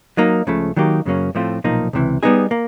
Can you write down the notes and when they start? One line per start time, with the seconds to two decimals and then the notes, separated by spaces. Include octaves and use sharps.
0.17 F#3 A#3 D#4
0.47 C#2 C#3 F3 A3
0.77 D#3 F#3 A#3 D#4 G4
1.06 F#2 C#3 F#3 A#3 C#4
1.35 A2 F3 A3 C4 F4
1.64 B1 A#2 F3 A#3 D#4
1.93 C#2 C3 E3
2.23 G3 B3 D#4 G#4
2.51 A#3